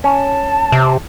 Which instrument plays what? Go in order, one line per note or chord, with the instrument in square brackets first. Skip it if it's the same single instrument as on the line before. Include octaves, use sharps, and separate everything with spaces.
[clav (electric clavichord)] C#4 [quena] A5
[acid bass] C3